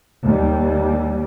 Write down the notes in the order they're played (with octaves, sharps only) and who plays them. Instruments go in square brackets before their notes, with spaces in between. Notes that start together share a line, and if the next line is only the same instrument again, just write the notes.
[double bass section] D#2 G3